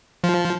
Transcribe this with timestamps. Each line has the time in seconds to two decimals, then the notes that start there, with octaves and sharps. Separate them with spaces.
0.24 F3